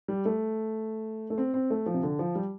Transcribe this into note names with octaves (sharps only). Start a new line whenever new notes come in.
G3
A3
A3
C4
C4
A3
F3
C3
D3
F3
G3